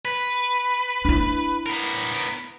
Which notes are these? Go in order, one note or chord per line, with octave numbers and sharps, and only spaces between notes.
B4
D4 E4
B3 A#4